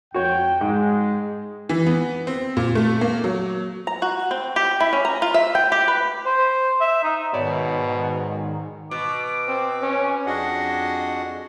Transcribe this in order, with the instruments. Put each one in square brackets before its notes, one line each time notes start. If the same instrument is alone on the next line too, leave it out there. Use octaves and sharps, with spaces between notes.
[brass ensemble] F2 G5 [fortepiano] F#4 C#5
[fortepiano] G#2 [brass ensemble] G#3
[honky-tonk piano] E3
B3
C4
A#2
A3
A#3
F#3
[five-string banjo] A#5
F#4
C4
G4
E4
C#4
A#5
F4
E5
G5
G4
B4
[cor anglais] C5
E5
D#4
[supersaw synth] G#2 D#3 [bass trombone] B2 [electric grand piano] C#5 D5 B5
[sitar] B2 [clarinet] D6
[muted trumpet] C4
C#4
[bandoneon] F2 D4 F#4 G#4 D#5 F#5